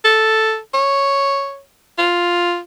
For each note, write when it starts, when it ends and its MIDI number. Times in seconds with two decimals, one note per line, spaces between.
0.05 0.58 69
0.74 1.60 73
1.98 2.59 65